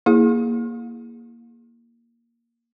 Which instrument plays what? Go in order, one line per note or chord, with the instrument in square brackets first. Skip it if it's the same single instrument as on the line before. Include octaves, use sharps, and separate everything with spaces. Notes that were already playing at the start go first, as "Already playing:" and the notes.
[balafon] A#3 E4 G#4